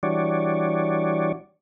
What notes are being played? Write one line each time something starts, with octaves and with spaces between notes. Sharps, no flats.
E3 G3 D4 F#4 C#5 D5